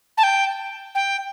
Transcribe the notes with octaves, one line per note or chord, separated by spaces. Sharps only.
A5
G5
G5